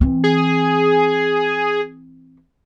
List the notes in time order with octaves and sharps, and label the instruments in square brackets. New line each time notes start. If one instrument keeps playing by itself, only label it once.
[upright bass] E3 C4
[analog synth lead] G#4